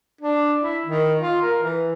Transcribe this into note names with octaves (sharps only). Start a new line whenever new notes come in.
D4
E4
D#3
F4
A#4
E3